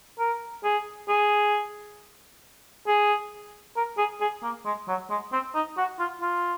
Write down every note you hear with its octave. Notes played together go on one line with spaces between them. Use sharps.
A#4
G#4
G#4
G#4
A#4
G#4
G#4
A#3
G#3
F#3
G#3
C4
D#4
F#4
F4
F4